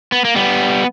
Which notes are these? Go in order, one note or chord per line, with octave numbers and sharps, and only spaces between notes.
B3
A#3
G3 B3